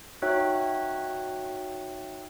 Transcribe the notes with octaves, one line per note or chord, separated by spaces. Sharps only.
D#4 F#4 C#5 E5 G5 F#6